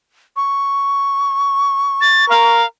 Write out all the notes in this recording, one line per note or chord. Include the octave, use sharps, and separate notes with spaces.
C#6
A6
A#4 F5